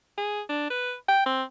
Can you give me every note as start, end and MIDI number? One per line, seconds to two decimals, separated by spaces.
0.18 0.41 68
0.49 0.67 62
0.70 0.94 71
1.09 1.25 79
1.26 1.43 60